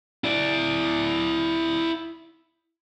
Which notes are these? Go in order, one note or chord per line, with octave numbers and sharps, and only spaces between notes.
E4 D5